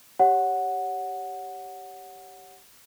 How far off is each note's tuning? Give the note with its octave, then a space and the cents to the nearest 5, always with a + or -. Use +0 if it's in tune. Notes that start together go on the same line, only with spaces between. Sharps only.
G4 +0 C#5 +0 F#5 -5